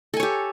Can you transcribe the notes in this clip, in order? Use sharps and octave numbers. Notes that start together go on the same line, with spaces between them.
G4 A4 C#5 G#5